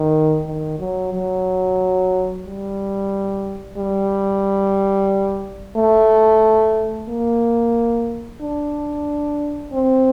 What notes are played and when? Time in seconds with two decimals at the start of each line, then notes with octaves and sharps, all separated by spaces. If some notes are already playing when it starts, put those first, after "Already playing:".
Already playing: D#3
0.46 D#3
0.79 F#3
1.13 F#3
2.45 G3
3.77 G3
5.76 A3
7.09 A#3
8.42 D4
9.73 C4